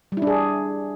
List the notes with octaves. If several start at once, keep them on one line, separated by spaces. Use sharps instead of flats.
G3
E4
D4
G#4